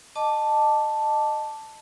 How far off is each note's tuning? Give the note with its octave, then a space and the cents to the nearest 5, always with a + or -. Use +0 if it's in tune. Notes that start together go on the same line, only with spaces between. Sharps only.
D#5 -20 A5 +0 D6 +0